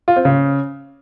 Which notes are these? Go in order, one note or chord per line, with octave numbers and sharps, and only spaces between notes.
F4
C4
C#3